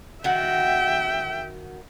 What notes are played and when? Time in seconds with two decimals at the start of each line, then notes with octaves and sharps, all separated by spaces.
0.24 D#3 F#4 E5 F#5 G5